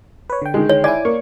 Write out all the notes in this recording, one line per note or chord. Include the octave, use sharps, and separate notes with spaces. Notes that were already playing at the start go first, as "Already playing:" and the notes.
B4 C#5
D3 G5
D#3 G#3
C#5
E4 D5 G#5 D6
A#3 C#6